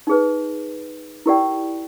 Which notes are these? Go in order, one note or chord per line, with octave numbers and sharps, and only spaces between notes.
D#4 G#4 B4
E4 G4 A#4 D5 G5